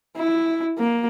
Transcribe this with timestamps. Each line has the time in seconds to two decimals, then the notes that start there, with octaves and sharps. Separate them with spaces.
0.17 E4
0.78 A#3